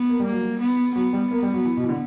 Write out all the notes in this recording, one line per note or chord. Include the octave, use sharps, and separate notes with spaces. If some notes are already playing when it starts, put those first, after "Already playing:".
Already playing: B3
A#3
G3
A#3
F#3
G3
B3
F#3 B3
G3
A#3
G3
F#3
E3
B2
E3
D3